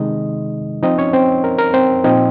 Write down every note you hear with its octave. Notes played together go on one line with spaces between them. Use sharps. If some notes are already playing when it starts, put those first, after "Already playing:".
Already playing: C3 D#3 G#3 D#4 D#5
F3 C4 D#4 D#5
C#4 C#5
C4 C5
A#4
A#4
C4 C5
A#2 F3 C4 D#4 D#5